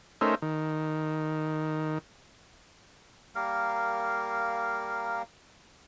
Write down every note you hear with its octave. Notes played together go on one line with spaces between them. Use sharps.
A3 C#4 D#4 A#4 C5 E5
D#3
G3 A#3 A#4 F5